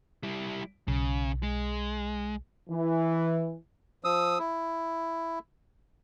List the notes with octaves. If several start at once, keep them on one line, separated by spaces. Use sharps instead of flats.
G3 E4
B1 C#3
G#3
E3
F3 D#6 E6
E4